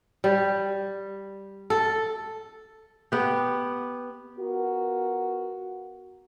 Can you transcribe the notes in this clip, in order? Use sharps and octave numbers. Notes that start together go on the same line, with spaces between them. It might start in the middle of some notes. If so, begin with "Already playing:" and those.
G3
A4
B3 G4
B3 F4 F#4 A#4